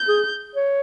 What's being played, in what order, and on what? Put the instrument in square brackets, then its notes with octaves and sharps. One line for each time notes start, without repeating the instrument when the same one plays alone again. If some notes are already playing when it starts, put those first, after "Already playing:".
Already playing: [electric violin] G6
[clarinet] G#4
C#5